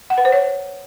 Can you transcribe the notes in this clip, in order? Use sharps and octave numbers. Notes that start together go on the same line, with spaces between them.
F#5
B4
C5
C#5